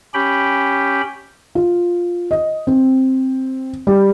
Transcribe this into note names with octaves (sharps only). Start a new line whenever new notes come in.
C#4 G4 G5 B5
F4
D#5
C4
G3